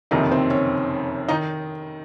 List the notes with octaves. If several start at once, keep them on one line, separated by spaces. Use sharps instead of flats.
F#1 F2 C3 D#3 D#4
C4
C#4
D#3 D#4